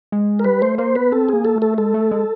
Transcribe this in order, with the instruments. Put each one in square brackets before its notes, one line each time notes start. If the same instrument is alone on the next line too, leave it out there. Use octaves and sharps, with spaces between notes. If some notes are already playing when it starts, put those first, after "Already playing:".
[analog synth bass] G#3
[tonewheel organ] A#4
[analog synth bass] G3 [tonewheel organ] B4
[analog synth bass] A3 [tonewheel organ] C5
[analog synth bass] A#3 [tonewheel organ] C5
[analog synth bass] B3 [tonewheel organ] B4
[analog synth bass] C4 [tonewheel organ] A4
[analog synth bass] A#3 [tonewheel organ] G#4
[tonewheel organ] A4
[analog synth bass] A3
[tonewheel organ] A4
[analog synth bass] G#3 [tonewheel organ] A4
[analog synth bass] A3
G#3